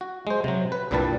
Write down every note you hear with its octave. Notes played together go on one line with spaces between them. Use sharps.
F#4
G#3 C5
C3 F#3
B4
C2 G2 A#2 G3 B4 A5